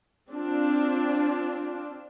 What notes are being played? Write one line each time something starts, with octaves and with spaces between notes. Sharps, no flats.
C4 D4 F4